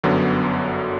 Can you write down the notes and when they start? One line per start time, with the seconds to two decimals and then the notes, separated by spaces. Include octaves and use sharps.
0.04 G1 F#2 D3 F#3 B3